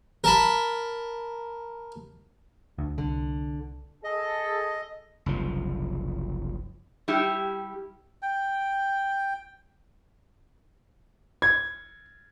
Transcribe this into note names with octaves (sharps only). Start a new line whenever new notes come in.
A#4 A5 B5
D2
C2 D3
G#4 A4 D#5
F#1 C2 F3
G3 E4 G4
G5
G#6